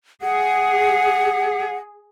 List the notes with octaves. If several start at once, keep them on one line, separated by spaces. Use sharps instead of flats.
G#4 F#5